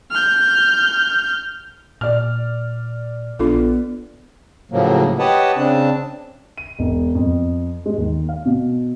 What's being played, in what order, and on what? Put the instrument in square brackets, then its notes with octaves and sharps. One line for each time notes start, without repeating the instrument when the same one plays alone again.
[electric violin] F6 G6
[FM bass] A#2 [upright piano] D5 F6
[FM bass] A#1 [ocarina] B3 [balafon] D4 F4 A4
[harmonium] A2 C#3 F3 F#3 A#3
G4 B4 C#5 D#5 F#5 A5
C#3 C4 D4 A5
[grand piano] D#7
E1
F2
G#3
D#2
F5
B2